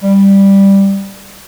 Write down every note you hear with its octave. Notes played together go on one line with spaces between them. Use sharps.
G3